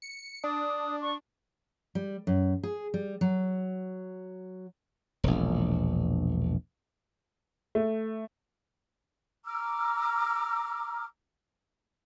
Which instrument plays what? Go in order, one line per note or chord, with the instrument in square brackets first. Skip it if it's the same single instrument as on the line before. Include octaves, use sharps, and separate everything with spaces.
[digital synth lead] C#7
[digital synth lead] D4 [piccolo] D#6
[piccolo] C#6
[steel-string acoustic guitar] G3
F#2
G#4
G3
F#3
[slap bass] E1 A#1
[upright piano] A3
[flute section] A#5 D6 E6 F6